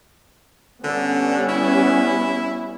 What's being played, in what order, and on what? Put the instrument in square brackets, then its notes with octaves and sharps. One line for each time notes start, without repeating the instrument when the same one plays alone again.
[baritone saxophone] D3 [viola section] G3 B3 C#4
[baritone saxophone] E4